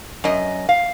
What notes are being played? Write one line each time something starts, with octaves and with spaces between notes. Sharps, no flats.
F#2 D#5
F5